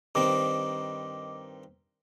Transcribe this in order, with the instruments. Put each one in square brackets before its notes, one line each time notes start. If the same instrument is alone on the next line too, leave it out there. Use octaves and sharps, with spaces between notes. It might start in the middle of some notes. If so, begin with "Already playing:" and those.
[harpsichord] G2 D#3 C4 [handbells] D#5 D6